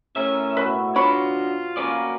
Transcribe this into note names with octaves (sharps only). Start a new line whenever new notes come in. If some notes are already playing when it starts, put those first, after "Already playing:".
A2 C#4 A#4 E5
B2 B4 C#6
D4 F4 F#4 C#5 B5
A#3 C#4 F#4 B4 D5